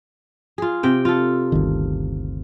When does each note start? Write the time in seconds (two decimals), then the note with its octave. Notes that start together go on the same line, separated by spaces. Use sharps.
0.58 F4 G#4
0.83 C3 G5
1.05 F4 A4
1.52 G1 D2 D#3